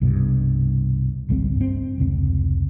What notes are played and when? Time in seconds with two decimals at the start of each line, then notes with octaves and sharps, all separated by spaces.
0.01 C2 G2 B2
1.29 G#1 C#2 G3 C4
1.56 G2 C4
1.98 F1 C#2 C4